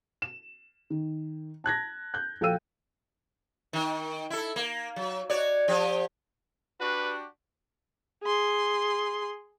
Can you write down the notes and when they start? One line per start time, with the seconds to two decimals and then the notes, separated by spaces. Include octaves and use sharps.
0.22 E7
0.90 D#3
1.64 A5 F#6 G#6 A#6
2.14 F#6 G6
2.41 A#1 A4 F5 G5 E6 D#7
3.73 D#3
4.30 E4 A4
4.56 A#3
4.96 F#3
5.30 F#4 C#5 D5
5.68 F3 G4
6.81 D4 F#4 G4 B4
8.23 G#4 C6